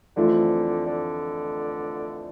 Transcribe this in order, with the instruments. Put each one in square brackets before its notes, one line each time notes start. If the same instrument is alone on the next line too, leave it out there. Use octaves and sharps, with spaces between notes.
[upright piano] F2 E3 A3 C4 F4 [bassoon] D3
[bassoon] D3